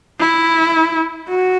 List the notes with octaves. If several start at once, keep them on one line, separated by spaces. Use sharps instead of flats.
E4
F#4